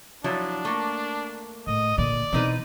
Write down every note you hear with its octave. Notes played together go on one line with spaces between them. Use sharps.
F3 F#3 D4 E4
A3 A#3
A2 D#5
A#2 D3 D5
B2 E3 C4 D#4 B4